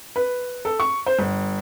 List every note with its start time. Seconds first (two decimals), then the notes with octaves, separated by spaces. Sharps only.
0.16 B4
0.65 A4
0.80 C#6
1.06 C5
1.19 G1